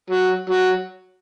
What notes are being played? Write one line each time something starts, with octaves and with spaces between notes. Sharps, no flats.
F#3
F#3